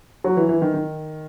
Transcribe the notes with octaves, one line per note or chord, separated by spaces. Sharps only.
F#3
E3
E3
D#3
D#3